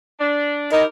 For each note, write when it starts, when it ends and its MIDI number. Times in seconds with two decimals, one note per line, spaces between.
0.20 0.71 62
0.72 0.84 63
0.72 0.84 64
0.72 0.84 67
0.72 0.84 70